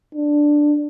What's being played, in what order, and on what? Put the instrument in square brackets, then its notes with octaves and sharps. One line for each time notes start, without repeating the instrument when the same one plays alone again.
[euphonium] D4